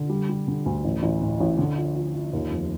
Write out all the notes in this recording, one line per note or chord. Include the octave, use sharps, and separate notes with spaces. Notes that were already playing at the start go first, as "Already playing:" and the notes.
Already playing: D3
G3
G3
D3
D2
A1
A1
A2
A1
D3
F3
F3
F3
D#2
F1